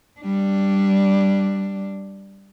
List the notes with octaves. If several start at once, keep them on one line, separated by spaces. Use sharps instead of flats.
G3 D4